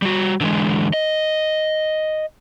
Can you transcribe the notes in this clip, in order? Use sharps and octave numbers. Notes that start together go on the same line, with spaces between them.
G3 F#4
D3 E3 G#3
D#5